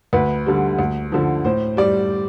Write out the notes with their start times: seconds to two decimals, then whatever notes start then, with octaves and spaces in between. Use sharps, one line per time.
0.13 D2 B4
0.46 D3 G3
0.79 D2
1.12 D3 F3
1.45 A2 C5
1.77 G3 D5